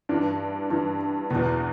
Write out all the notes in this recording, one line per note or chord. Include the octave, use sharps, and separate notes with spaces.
G2 E3 D4
G2 E3
E2 B2 B3